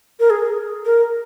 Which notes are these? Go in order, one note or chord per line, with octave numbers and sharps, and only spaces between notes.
A#4
G#4
A#4